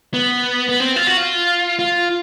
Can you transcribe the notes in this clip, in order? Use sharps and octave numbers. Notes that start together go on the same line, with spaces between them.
B3
B3
C4
F4
F#4
F4
F4